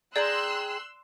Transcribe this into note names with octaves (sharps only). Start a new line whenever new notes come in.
G#4 D5 G5 A#5 C6 E6 F#6 F#7